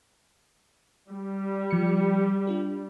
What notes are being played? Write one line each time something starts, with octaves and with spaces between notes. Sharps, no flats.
G3
F3 C#7
D4 F4 G4